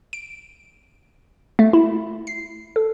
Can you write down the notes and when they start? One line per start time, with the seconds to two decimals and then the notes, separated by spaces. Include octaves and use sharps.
0.13 D7
1.59 A3
1.73 E4
2.27 C7
2.76 A4